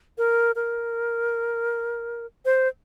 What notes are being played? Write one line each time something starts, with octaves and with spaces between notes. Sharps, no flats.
A#4
A#4
C5